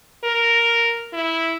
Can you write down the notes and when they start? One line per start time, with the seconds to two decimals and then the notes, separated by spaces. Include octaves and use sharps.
0.24 A#4
1.13 E4